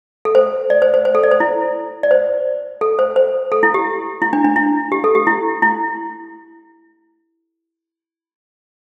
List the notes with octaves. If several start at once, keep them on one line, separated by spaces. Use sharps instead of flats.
A4
C5
D5
C5
C5
C5
A4
D5
C5
E4
D5
C5
A4
C5
C5
A4
E4
G4
E4
D4
D4
E4
G4
A4
G4
E4
E4